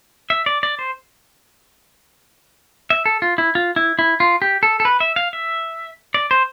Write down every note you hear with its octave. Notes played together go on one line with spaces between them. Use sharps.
E5
D5
D5
C5
E5
A4
F4
E4
F4
E4
E4
F4
G4
A4
A4
B4
E5
F5
E5
D5
C5